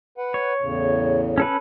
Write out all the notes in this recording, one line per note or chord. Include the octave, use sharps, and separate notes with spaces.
B4 F#5
C#5
E2 A2 C#3
C#4 A4 B4